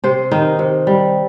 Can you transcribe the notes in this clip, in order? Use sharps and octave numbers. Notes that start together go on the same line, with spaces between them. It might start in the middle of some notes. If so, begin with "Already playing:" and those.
C3 C5
D#3 D#4
C3
G3